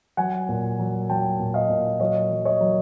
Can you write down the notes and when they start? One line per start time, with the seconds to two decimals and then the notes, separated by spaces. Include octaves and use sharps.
0.17 F#3 F#5 G#5
0.49 A#2
0.79 F#3
1.09 F#3 G5 A5
1.39 A#2
1.54 D#5 F5
1.70 A#2
2.00 F#3 C#5 D#5
2.31 F#3
2.45 C#5 D#5
2.61 F#3